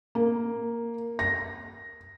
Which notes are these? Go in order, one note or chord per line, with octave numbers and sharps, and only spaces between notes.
A#3
A#6